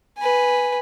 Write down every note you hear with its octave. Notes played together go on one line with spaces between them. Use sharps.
B4 G#5